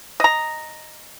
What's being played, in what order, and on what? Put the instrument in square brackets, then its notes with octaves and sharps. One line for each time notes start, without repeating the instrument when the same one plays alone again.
[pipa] D#5 A#5